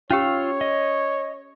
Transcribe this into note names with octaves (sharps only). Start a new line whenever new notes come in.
C#4 F4 G4 C#5 F5 E6
D#5